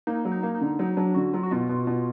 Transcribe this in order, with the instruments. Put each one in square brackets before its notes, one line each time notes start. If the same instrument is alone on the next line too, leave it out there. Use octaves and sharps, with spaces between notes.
[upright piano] A#3 [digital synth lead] D#4
[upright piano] F#3
[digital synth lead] D#4
[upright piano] A#3
[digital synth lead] D#4
[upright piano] D3
[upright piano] F#3 [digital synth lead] D#4
[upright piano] F#3 [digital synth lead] D4
[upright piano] D3 [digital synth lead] F#4
[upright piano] F#3 [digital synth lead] F4
[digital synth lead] F#4
[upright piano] B2 [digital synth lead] F4
[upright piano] B2
B2